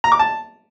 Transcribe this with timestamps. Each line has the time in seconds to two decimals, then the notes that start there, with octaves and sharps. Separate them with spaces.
0.04 A#5
0.12 D6
0.19 A5